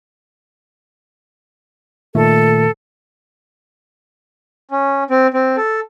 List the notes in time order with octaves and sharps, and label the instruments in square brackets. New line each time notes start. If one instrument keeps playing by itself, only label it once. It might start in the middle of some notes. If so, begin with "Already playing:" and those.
[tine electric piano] A#2 D#3 A3 [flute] A4
[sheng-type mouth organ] C#4
C4
C4
A4